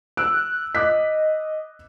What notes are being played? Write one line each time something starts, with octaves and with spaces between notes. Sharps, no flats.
E6 F#6 D7
D#5 D6 F#6 B6